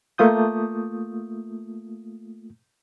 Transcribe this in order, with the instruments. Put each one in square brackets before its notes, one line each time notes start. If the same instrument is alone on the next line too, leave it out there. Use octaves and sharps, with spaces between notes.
[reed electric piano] A3 A#3 F4 D#6 G6